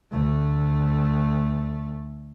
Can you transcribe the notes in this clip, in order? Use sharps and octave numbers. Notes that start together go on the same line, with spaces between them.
D2 A3